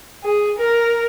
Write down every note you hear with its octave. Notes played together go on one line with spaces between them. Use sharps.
G#4
A#4